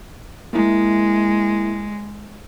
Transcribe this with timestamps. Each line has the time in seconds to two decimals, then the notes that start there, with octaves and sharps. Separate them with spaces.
0.53 G#3 A#3 E4